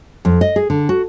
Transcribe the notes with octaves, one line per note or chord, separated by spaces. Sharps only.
F2
D#5
G#4
D3
F#4